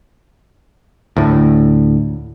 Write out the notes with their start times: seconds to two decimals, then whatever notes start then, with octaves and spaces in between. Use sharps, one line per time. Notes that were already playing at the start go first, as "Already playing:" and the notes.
1.17 D2 A2